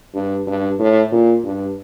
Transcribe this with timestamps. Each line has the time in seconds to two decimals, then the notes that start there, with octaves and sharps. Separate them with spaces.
0.15 G2
0.47 G2
0.79 A2
1.12 A#2
1.44 G2